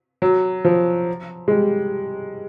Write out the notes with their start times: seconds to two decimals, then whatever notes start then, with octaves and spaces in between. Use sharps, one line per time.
0.22 F#3
0.65 F3
1.48 G#3
1.52 G3